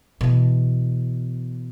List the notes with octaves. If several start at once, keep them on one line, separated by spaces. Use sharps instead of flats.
B2 E3